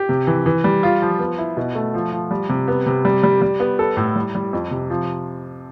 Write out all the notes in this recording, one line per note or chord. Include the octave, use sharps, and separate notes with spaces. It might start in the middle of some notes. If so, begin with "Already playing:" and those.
Already playing: G4
C3
E3
E3
G3
F4
F3
B3
E4
B2
A3
F3
F3
G3
C3
B3
C3
G3
G3
G3
B3
A4
A2
G3
G3
F2
C3
F3